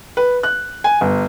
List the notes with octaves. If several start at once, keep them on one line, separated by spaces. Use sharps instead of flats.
B4
F#6
G#5
G1